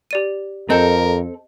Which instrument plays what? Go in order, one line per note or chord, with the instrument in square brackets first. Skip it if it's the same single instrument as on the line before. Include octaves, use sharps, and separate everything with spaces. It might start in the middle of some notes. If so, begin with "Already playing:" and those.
[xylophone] G4 D5 D#7
[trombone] F2 [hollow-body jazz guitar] C4 A4 [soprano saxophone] A#4 [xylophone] D#5 G6